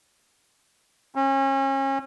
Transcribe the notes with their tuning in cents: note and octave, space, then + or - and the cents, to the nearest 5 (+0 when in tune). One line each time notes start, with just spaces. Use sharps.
C#4 -35